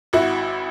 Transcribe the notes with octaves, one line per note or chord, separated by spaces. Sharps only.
G#1 E4 F#4